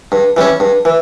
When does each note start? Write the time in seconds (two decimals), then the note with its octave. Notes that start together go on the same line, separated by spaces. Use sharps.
0.12 G2
0.37 E3 G3 C#4
0.60 G2
0.85 E3